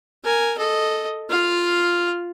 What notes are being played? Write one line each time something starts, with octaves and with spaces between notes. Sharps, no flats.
A#4 G#5
A4 D#5
F4 F5